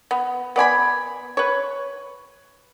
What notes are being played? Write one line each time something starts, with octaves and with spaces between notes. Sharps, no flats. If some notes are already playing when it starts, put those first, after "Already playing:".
B3
B3 D5 G#5 B5
B4 C#5